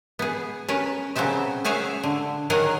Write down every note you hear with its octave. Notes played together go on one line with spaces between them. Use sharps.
B3 G#4
C#4 A#4 B4
C#3 F#3 B3 C4 E5
C#4 F#4 G#4 E5 F5
D3
D#3 F#3 G#4 A#4 F#5 G#5